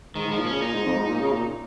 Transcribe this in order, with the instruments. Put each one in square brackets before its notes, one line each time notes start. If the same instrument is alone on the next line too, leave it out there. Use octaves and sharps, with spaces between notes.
[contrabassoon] G#2 [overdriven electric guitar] D#3
[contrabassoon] G#2 [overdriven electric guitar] F3
[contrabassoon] A#2
[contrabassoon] C#3 [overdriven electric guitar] C#4
[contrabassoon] A#2 [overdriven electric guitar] D#4
[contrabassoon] G#2
F2
G#2
A#2
C#3
A#2